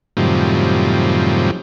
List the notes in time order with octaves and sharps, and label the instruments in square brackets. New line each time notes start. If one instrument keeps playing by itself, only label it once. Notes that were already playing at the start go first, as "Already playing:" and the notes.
[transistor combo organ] F#2 A2 C3 D#3 F3 G3